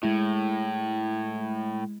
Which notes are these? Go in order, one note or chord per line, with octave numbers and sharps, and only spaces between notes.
A2 G#3 E4